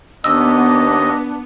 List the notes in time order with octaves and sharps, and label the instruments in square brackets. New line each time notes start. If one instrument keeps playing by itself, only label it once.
[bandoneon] D#2 D#5 [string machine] B3 [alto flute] D4 [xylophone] E6